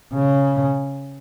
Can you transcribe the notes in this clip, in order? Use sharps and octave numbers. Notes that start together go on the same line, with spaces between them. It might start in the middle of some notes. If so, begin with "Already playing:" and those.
C#3